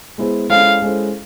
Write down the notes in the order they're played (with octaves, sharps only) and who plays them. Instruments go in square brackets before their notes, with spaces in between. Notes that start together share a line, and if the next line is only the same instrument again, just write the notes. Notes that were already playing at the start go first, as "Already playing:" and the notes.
[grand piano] G#3 B3 E4 G#4 C5
[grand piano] G#3 C#4 E4 A4 C5 [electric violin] F5
[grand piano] G#3 C#4 E4 A4 C5